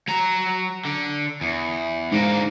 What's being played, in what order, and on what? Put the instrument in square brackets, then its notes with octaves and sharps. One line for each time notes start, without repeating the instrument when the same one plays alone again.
[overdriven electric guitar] F#3 A#5
D3
E2
[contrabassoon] G#2 [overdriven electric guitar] D3 A#3